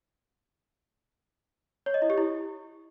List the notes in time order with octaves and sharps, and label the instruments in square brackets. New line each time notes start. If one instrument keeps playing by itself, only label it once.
[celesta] C#5
D#5
E4
G4
E4